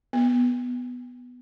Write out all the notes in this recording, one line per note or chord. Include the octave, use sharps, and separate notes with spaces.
B3